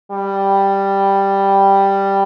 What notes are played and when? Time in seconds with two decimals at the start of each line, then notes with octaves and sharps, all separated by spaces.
0.11 G3